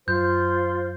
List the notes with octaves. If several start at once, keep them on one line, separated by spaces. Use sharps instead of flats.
F#2 F4 C5 G6